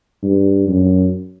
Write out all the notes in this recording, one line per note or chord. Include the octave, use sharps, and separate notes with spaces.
G2
F#2